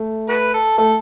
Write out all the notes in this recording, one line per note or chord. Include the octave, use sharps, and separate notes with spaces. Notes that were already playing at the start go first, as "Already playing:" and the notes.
Already playing: A3
F#4 B4
A4
A3 A4